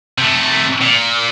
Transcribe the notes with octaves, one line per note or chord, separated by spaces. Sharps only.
C3 A3
A#2